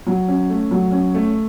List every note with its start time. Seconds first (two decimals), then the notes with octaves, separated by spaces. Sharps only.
0.07 F#3
0.28 C#4
0.49 A3
0.71 F#3
0.92 C#4
1.14 A3